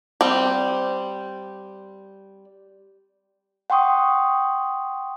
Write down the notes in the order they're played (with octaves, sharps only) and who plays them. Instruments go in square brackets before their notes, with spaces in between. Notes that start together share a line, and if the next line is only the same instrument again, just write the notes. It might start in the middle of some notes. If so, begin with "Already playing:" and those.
[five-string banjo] G3 C4
[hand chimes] F#5 G5 C6 C#6 D#6